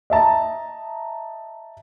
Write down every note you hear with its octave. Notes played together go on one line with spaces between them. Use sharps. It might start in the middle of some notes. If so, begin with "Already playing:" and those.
D#5 E5 A5 A#5